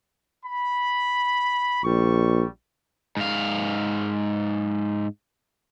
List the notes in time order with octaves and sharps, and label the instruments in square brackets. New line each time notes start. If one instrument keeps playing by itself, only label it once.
[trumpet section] B5
[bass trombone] A#1 [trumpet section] G3 C#6
[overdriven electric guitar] G#2 F5